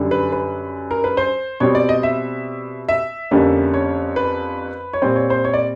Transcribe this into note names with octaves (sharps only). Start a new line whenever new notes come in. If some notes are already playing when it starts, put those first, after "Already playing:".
Already playing: F#2 D3 G3
B4
B4
A#4
B4
C5
B2 G3 C4 C#5
D5
D#5
E5
E5
F2 D3 G3 A#3 C#4
C#5
B4
C#5
A#2 G3 C4 C5
C#5
C5
C#5
D5